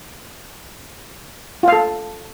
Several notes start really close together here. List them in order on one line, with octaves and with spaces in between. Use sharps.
F4 F5 A4